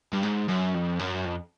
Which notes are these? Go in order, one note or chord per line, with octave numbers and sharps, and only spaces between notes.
G2
G#2
F#2
F2
F#2
F2